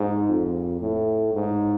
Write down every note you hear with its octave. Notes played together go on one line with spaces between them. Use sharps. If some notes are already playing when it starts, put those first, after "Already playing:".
Already playing: G#2
F2
A2
G#2